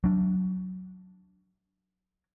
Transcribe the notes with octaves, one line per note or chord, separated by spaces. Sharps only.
F#3 D4